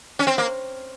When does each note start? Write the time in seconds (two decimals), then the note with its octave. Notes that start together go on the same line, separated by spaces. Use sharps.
0.19 C#4
0.27 C4
0.38 A#3